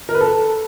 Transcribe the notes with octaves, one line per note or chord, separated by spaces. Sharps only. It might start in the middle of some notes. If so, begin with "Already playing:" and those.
A#4
B4
A4